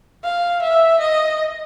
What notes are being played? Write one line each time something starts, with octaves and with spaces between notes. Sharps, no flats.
F5
E5
D#5